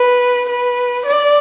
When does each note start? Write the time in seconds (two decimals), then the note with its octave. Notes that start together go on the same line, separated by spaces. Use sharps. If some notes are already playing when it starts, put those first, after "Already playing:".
Already playing: B4
0.49 B4
1.05 D5